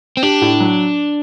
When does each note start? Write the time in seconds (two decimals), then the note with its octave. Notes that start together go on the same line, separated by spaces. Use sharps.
0.17 C4
0.23 D4 G4
0.42 A2
0.60 F#3